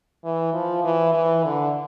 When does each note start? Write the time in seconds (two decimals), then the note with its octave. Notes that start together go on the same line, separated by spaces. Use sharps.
0.24 E3
0.53 F3
0.84 E3
1.14 E3
1.44 D3